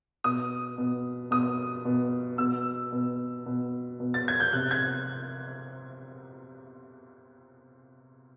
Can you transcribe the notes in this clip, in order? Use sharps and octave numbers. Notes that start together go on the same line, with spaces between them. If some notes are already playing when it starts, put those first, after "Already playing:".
B2 D#6
B2
B2 D#6
B2
B2 E6
B2
B2
B2
A6
G#6
G6
C3 F#6
G#6